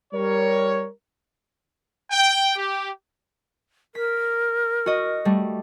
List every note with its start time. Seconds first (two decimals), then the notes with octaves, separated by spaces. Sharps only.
0.14 G3 A#4 C#5
2.11 G5
2.56 G4
3.95 A#4 B6
4.86 F#4 D#5
5.25 G3 A3